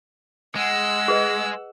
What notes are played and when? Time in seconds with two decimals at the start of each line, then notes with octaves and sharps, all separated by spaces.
0.55 G#3 F#5 E6
1.08 G#4 B4 D#5